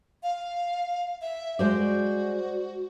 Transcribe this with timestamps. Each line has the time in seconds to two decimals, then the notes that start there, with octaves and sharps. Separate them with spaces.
0.23 F5
1.21 E5
1.59 G#3 F#4 C5 D5